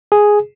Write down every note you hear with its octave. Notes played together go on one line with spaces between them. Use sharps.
G#4